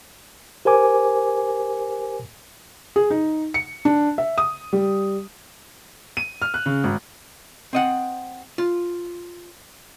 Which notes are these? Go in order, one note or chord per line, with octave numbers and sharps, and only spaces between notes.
G4 A#4 C5 G#5 D6
G#4
D#4
C#7
D4
E5
D#6
G3
D#7
F6
F#6
C#3
G#1
C4 D#5 F#5
F4